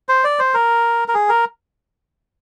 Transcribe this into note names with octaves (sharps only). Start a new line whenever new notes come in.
C5
D5
C5
A#4
A#4
G#4
A#4